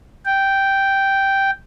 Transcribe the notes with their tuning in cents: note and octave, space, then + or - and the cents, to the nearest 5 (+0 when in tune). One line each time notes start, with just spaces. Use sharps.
G5 -5